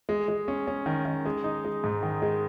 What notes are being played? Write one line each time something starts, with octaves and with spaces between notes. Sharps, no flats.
G#3
G#3
C#4
C#4
D#3
D#3
G#3
D#4
G#3
G#2
D#3
G#3